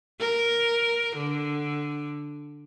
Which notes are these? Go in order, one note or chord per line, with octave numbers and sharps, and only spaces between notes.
A#4
D3